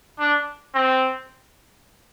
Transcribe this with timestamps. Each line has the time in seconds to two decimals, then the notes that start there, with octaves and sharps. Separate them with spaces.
0.19 D4
0.74 C4